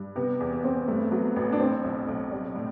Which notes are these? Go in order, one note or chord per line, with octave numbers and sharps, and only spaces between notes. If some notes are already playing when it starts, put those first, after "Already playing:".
Already playing: G2
C3 B3
E2
B3
E2 C4
B3
G2 A3
F#3 B3
A1 B3
D4
A2 C4
B1
B1
G3
A2